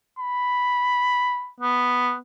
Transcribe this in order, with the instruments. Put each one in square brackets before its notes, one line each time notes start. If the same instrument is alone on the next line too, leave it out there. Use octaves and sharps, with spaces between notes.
[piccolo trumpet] B5
[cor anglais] B3